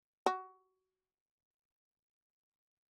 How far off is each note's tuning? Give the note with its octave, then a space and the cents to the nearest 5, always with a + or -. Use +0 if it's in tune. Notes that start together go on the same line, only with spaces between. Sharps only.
F#4 +20